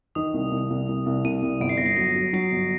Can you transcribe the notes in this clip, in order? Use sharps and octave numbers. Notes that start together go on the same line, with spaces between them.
D#3 D#6
C2
C2
C2
C2
C2
C2 D#7
C2
G1 D7
C7
G1 A#6
C7
F#3 A#6
F#3
F#3 C7
G1